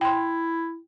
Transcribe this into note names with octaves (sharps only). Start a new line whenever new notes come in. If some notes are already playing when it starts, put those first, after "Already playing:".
E4 G5 C6